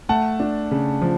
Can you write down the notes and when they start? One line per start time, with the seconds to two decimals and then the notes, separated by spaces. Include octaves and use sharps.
0.09 A3 F#5 A5
0.40 D4
0.71 C#3
1.02 F3